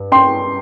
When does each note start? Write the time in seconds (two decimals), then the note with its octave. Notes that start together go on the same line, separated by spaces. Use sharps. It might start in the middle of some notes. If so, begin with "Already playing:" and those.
Already playing: G2
0.12 G5 C6